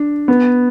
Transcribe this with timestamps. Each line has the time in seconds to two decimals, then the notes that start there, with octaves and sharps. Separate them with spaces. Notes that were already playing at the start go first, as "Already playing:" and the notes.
Already playing: D4
0.28 B3